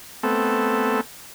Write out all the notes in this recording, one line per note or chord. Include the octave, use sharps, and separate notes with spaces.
A3 B3 C4 A4